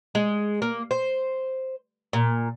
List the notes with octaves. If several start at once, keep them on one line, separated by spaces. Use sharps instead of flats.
G#3
A#3
C5
A#2